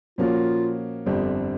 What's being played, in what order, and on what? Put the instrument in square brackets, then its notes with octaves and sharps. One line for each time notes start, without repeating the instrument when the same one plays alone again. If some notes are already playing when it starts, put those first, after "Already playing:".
[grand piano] A#2 F3 A#3 C#4 F#4 [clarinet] F4
[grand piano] G1 F2 D3 G3 C4